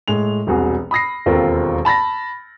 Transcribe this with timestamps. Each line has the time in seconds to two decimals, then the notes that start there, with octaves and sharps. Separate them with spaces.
0.08 A2 G#3 F7
0.47 E1 C2 F#4 G#4
0.91 B5 D#6 A#6 C7
1.26 E1 D#2 C4 F4 A4 A#4
1.85 A5 B5 A6 A#6